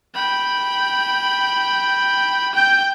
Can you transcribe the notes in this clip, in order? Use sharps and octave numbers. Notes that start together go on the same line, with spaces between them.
G5 B5
G5 G6